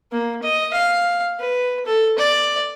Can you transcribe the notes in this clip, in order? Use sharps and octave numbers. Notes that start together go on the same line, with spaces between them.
A#3
D#5
F5
B4
A4
D5